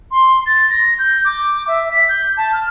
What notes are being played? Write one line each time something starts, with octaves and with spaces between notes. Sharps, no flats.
C6
A6
A#6
G6
D6
E5
B6
G6
A5
F6